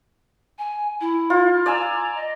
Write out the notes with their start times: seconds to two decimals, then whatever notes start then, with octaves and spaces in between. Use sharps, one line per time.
0.59 G#5
1.01 E4
1.30 F4
1.66 D5 G#5 A#5 E6
2.16 D#5